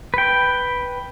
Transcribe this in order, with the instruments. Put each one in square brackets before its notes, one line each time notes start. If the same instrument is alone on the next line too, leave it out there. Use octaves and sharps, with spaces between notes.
[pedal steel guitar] B4 G5